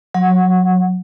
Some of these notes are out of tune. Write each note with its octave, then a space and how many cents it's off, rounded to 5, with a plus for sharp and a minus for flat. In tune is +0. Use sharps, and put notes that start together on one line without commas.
F#3 -20 F#5 +0